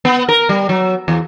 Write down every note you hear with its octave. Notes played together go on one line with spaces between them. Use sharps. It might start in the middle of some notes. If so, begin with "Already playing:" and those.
B3
A#4
G3
F#3
E2